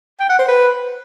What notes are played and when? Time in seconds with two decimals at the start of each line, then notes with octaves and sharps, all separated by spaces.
0.20 G5
0.29 F#5
0.39 C5
0.48 B4